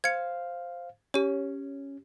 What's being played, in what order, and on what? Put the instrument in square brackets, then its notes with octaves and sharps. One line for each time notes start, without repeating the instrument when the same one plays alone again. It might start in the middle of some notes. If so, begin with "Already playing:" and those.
[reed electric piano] C5 F5 [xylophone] G#6 C#7
[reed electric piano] C#4 [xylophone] G4 C#5